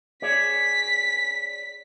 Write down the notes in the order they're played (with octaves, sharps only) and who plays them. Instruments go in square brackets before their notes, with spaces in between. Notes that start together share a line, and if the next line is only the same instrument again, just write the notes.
[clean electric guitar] G#4 C#5 D5 [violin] B6